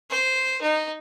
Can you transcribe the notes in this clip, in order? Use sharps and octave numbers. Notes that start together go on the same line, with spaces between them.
C5
D#4